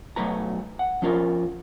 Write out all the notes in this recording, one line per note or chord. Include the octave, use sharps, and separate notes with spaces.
B1 F#3 A3 B4 A#5
F#5
F3 C#4 F4 A#4